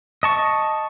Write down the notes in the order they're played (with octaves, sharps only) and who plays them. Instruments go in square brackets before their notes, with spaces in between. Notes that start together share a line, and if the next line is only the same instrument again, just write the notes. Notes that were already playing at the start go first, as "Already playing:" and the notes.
[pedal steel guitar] D#5 A5 C#6